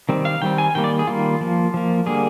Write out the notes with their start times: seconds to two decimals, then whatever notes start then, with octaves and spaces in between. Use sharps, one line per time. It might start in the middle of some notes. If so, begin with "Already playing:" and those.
0.09 D#3 G3 C4
0.25 F5
0.42 D#3 G3 C4 G5
0.58 G#5
0.75 D#3 G3 A#3 G5
0.84 D5
0.99 G#4
1.07 D#3 G3 A#3 F4
1.41 F3 A#3
1.74 F3 A#3
2.06 D3 G3 A#3 G#4